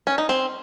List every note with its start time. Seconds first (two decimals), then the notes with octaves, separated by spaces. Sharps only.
0.07 C#4
0.18 D#4
0.29 C4